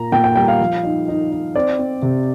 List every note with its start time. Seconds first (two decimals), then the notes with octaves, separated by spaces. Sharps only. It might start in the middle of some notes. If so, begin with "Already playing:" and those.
Already playing: A#2 A#3 A#5
0.12 A#2 G5
0.24 G5
0.36 G3 G5
0.48 F5
0.60 F3
0.84 D#4
1.08 D#4
1.31 D#4
1.56 C4 D5
1.79 C4
2.02 C3